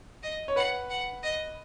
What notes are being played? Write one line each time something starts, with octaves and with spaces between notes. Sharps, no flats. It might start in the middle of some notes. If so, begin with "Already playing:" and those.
D#5
C#5
B4 F#5
F#5
D#5